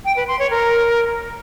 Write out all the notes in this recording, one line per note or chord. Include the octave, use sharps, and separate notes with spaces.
G5
B4
C6
C#5
A#4